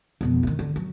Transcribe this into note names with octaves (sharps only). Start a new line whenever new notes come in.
E1 F2
G2 D#3
D3
F#3